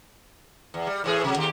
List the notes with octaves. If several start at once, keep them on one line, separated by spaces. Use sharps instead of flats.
E2
G3
A2 E3 G#4
C3 F#3
D#2 G4